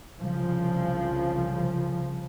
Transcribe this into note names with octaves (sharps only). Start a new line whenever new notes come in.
C2 C#3 F3